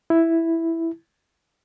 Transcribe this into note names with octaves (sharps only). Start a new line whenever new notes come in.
E4